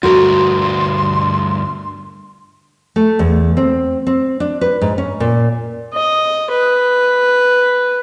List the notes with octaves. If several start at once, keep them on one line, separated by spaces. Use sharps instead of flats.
D2 G2 F#4 A#4 C6
A3
E2
C4
C4
D4
B4
G#2
C#4
A#2
D#5
B4